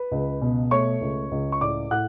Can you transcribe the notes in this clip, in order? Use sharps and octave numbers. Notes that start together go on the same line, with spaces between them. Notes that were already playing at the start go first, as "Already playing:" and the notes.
Already playing: B4 B5
C#2
B2
A3 C#5 C#6
C#2
C#2
C#6
A2 D5 D6
A2 F#5 F#6